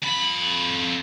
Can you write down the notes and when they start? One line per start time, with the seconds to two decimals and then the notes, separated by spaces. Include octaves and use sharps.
0.03 F2 B5